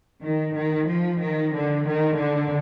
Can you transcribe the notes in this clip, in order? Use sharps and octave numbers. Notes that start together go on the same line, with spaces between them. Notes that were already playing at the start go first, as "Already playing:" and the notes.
D#3
D#3
F3
D#3
D3
D#3
D3